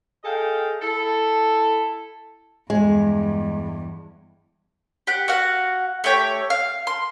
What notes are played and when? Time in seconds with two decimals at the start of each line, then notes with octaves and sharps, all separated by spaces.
0.24 G#4 A4 D#5 F5 G5
0.82 E4 A4
2.70 E2 G2 G#3
5.07 G4 F#5
5.28 F#4 F5 F#5
6.04 A3 G4 C#5 G5
6.50 F5
6.87 C6